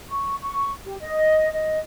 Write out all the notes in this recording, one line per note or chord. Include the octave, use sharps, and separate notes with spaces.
C#6
C#6
G4
D#5
D#5